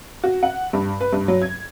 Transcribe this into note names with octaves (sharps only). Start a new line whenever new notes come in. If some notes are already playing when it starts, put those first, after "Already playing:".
F#4
F#5
G2
B4
G2
F#3
G#6